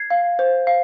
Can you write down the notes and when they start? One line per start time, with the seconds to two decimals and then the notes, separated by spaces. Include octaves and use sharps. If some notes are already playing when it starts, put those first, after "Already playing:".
Already playing: G#6 C7
0.11 F5
0.39 C5
0.67 F5